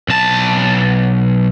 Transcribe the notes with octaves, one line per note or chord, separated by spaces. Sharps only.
B1 A5